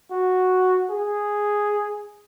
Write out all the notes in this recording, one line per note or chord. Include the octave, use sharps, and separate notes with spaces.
F#4
G#4